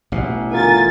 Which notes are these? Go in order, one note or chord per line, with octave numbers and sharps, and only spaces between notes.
A1 B2
D3 F4 A#4 G#5 A6